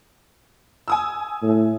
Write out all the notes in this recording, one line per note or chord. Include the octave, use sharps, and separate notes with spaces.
G#5 D#6 E6
A2